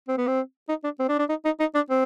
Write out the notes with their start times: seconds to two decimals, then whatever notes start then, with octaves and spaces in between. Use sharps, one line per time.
0.08 C4
0.17 B3
0.27 C4
0.69 D#4
0.84 D4
1.00 C4
1.09 D4
1.19 D4
1.29 D#4
1.45 D#4
1.60 D#4
1.75 D4
1.90 C4